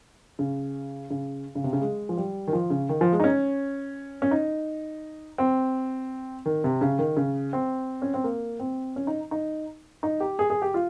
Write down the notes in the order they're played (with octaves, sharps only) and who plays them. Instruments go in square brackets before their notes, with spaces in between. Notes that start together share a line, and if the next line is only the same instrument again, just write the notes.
[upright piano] C#3
C#3
C#3
C3
C#3
G#3
F3
G3
D#3
F3
C#3
D#3
F3
G#3
D#4
C#4
C#4
D#4
C4
D#3
C3
C#3
D#3
C#3
C4
C#4
C4
A#3
C4
C#4
D#4
D#4
D#4
G4
G#4
G#4
G4
F4